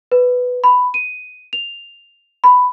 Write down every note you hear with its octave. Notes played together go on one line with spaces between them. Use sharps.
B4
B5
D#7
F7
B5